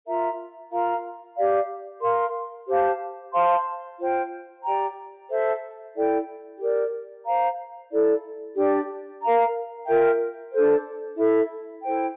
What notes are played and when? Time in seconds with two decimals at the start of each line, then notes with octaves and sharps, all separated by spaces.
0.06 F4 A#4 E5 A#5
0.71 F4 A#4 F5 A#5
1.36 G4 D5 F5
2.02 A#4 F5 C6
2.68 G4 C5 F5 A5
3.33 C5 F5 A5 C6
3.99 F4 C5 G5
4.64 G4 D5 G5 A#5
5.29 A4 C5 E5
5.95 E4 A4 D5 G5
6.59 G4 A#4 D5
7.25 C5 F5 A#5
7.90 E4 A4 D5
8.56 D4 G4 D5 G5
9.22 A#4 F5 A#5
9.87 F4 A#4 E5 G5
10.52 D4 A4 C5
11.17 E4 A4 E5
11.83 E4 A4 C5 G5